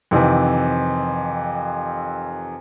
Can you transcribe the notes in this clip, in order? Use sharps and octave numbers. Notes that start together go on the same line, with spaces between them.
F2 C3 D#3 E3